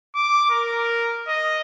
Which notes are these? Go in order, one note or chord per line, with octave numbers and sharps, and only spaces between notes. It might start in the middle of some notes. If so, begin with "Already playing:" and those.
D6
A#4
D#5